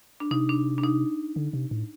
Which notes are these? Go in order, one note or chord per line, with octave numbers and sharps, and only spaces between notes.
D4
C3 D#4
D4
D4
D#4
D3
C3
A2